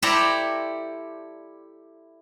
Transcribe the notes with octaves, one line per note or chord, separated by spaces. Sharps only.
E4 G4 A4 C5 D5 A#5